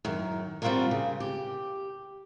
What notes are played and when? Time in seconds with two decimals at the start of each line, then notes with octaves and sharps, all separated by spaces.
0.05 F#2 D#3
0.62 G3 C4 D4 F4 F#4 A#4
0.91 C#3
1.20 G4